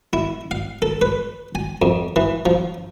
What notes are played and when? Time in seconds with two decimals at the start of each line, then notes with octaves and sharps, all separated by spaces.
0.13 E4
0.51 F5
0.82 A4
1.01 B4
1.55 G#5
1.82 F2
2.16 E3
2.46 F3